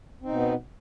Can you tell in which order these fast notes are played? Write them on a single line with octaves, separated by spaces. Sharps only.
C4 D#4 B2 B3